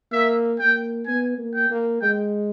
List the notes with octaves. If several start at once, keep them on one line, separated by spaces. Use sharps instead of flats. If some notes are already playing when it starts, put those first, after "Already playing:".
A#3 E5
A#3 G5
B3 G#5
A#3
G5
A#3
G#3 G5